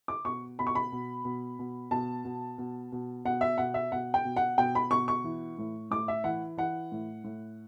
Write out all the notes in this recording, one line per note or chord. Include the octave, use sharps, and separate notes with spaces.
D6
B2 C#6
B2 B5
C#6
B5
B2
B2
B2
B2 A5
B2
B2
B2
B2 F#5
E5
B2 F#5
E5
B2 F#5
G5
B2
F#5
B2 G5
B5
B2 C#6
C#6
E3
A2
A2 D6
E5
E3 F#5
E3 F#5
A2
A2